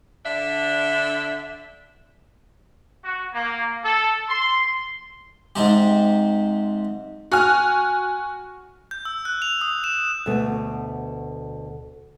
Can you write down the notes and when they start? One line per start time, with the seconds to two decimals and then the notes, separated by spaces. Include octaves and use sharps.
0.24 D3 D4 E5
3.04 F#4
3.33 A#3
3.83 A4
4.28 C6
5.56 G#2 C3 C4 G4
7.32 F#4 G#5 F6
8.91 G6
9.05 E6
9.25 F#6
9.42 F7
9.61 D#6
9.84 E7
10.26 D2 B2 A3 B3